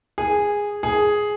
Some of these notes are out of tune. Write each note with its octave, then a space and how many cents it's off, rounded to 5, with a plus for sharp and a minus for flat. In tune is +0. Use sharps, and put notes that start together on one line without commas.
G#4 -10
G#4 +5